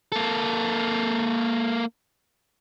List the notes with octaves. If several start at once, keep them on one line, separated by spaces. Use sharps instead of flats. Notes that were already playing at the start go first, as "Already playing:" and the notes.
A#3 A4